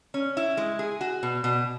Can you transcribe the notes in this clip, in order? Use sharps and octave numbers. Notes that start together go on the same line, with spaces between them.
C#4
E4
G#3
G#4
F#4
B2
B2